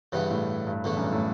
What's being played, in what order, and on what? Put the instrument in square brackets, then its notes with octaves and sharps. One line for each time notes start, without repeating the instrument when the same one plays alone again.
[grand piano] G2 [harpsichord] C#3 E3 G3 B3
[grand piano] A2
G2
[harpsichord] E2 D3 A3 [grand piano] A2
[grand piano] F#2
G2
A2